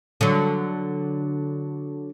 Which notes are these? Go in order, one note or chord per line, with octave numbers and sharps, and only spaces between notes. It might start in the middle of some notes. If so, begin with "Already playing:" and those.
D3 F#3